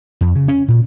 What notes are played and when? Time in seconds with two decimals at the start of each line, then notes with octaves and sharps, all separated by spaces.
0.21 F2
0.36 C#3
0.48 C#4
0.68 A#2